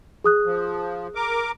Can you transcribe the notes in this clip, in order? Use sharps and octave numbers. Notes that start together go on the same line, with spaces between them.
G#4 D#6 F#6
F3
A#4 D6